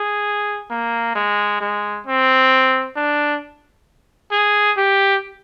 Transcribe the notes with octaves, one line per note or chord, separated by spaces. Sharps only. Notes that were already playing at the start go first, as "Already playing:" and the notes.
Already playing: G#4
A#3
G#3
G#3
C4
D4
G#4
G4